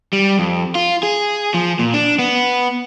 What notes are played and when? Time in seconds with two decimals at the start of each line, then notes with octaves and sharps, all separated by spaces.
0.13 G3
0.39 F2
0.75 F4
1.03 G#4
1.54 F3
1.79 A#2
1.94 D4
2.19 B3